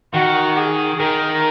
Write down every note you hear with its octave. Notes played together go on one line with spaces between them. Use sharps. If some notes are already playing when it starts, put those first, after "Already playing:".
D#3 F#4
G#4
D#3 A#4